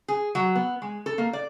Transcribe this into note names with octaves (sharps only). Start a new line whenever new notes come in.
G#4
F#3
B3
G#3
A4
A#3
D5